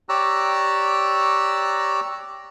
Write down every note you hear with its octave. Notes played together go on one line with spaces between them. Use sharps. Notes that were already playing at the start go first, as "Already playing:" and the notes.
G4 C#5 D5 A#5 E6 F#6